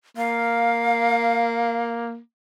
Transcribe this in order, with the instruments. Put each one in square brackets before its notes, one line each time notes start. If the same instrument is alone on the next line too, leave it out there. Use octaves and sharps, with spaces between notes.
[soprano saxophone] A#3 [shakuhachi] F5